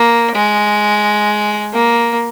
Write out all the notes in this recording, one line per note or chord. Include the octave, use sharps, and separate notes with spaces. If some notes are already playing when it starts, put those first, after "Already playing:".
Already playing: A#3
G#3
A#3